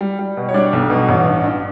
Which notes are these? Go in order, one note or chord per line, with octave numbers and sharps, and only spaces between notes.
G3
G3
B2
C#5
G3 D4 D5
B1
B2
A1
G2
G2